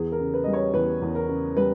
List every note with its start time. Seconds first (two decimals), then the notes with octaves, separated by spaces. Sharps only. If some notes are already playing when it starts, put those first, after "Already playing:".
Already playing: E2 G#4
0.12 A#4
0.20 C#3
0.34 B4
0.44 G3 D#5
0.53 C#5
0.74 E2 B4
1.02 E2
1.15 A#4
1.29 C#3
1.56 G3 B4